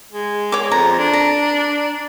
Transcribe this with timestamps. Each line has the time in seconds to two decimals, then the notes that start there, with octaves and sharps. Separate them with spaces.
0.12 G#3
0.52 C#5 D6
0.72 F2 A#5
0.98 D4
1.13 A#5